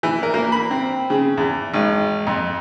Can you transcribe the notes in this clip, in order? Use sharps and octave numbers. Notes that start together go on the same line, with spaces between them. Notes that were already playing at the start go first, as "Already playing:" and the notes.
E3
A#4
A#3
B5
C4
C#3
E2
G#1
F2